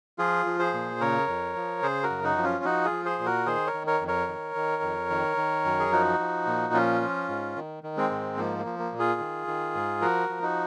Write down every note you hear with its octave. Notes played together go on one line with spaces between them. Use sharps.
F3 F4 G#4
F3
G#4 C5
A#2
C#3 A#4 C#5
F2
F3
C#3 G#4 C5
F#4 A#4
F#2
D#4 F#4
F3
C#4 F4
F3 D#4 F#4
F4 G#4
F3
G#4 C5
A#2
F#4 A#4
D#3 G#4 C5
A#4 C#5
D#3
A#4 C#5
F2
A#4 C#5
D#3
D#3
F2
D#3
D#3
F#2
G#4
F3 D#4 F#4
F3
A#2
F3 C#4 F4
F3
G#2
D#3
D#3
G#3 C4
G#2
F3 A#3
A#3
F3
A#3
A#2
F4 G#4
D#3
D#3
G#2
F3 F#4 A#4
F3
D#4 F#4